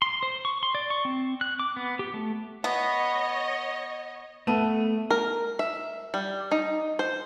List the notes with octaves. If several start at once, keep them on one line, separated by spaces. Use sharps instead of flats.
C6
C5
C#6
C6
D5
C#6
C4
F#6
D6
B3
G4
A3
B3 C#5 D#5
A3 B3 A5 D#7
A#4
E5
G3
D#4
C5